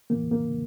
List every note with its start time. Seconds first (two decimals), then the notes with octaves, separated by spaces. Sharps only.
0.10 A2 E3 A#3
0.31 A#3